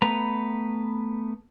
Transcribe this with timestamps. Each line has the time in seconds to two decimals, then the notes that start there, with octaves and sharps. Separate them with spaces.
0.02 A3 B3 B4 A#5